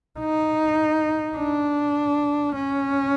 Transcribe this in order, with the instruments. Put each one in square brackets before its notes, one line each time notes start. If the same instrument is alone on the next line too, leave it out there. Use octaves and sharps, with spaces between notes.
[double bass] D#4
D4
C#4